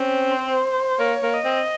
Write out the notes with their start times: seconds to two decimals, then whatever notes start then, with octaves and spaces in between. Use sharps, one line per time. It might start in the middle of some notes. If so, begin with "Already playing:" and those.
Already playing: C4 C#4
0.31 C5
0.99 A#3 C#5
1.23 A#3
1.34 D#5
1.44 C4